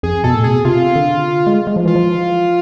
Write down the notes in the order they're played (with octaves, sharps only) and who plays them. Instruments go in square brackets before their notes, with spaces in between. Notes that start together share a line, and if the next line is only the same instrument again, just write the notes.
[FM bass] F2 [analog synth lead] G#4
[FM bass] B2 [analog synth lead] A4
[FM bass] A2
[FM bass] C3 [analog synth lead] G#4
[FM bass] B2
[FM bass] C3 [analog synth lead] F4
[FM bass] D3
G#3
G#3
F3
[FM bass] E3 [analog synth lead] F4
[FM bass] F3